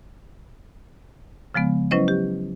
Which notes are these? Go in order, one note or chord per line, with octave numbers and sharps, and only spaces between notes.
C#3 F3 G#3 B3
F#3 C#4 E4 B4 C5 D#5
G4